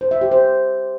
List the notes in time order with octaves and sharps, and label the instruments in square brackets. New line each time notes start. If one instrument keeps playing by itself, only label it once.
[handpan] C5
E5
G4
C5